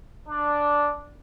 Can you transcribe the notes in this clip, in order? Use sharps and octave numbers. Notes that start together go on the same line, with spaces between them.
D4